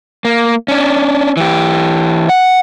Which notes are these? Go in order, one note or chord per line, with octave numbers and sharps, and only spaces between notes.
A#3
C#4 D4
E3 G4
F#5